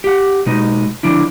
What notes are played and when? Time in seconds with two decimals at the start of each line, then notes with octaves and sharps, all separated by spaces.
0.04 G4 F#5
0.46 B2 G#3 D#4
1.03 D3 F3 D4 E4